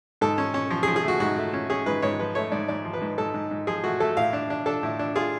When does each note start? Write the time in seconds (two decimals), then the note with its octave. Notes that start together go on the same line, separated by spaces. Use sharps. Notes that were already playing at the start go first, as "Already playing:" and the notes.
0.21 G#2 A4
0.38 C#4
0.54 C#4
0.70 F3
0.83 G#4
0.88 F3
0.96 G#4
1.03 A3 F#4
1.20 G#2 F#4
1.36 A3
1.53 C#4
1.70 C#4 G#4
1.86 G#2 B4
2.02 G#2 C#5
2.19 F3 B4
2.35 A3 C#5
2.52 G#2 D5
2.68 G#2 D5
2.85 F3
2.93 B4
3.01 G#2
3.18 G#2 A4
3.34 G#2
3.51 G#2
3.67 F3 G#4
3.84 A3 F#4
4.00 A3 A4
4.17 A2 F5
4.33 D4
4.50 D4
4.66 D4 A4
4.83 A2
4.99 D4
5.16 F4 G#4